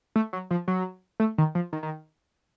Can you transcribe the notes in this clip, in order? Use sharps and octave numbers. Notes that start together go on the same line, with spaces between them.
A3
F#3
F3
F#3
A3
D#3
F3
D#3
D#3